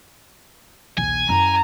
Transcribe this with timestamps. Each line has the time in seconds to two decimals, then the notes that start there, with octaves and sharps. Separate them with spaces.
0.97 A#1 D#2 G#5
1.29 F#2 E4 A#5